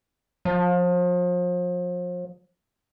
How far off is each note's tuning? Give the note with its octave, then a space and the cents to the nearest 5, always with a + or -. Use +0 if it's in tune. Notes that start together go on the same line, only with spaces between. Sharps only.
F3 +35